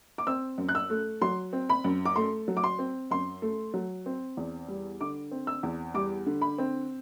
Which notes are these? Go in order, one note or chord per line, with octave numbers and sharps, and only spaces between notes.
D6
C4 E6
F#2
F#6
E6
A3
F#3 C6
C4
B5
F#2
D6
A3 C6
F#3
D6
C6
C4
F#2 C6
A3
F#3
C4
E2
G3
D3 D6
C4
E6
E2
G3 D6
D3
B5
C4